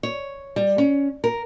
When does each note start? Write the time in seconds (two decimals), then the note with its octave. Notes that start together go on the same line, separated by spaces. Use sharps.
0.03 C#5
0.56 G3
0.78 C#4
1.24 A#4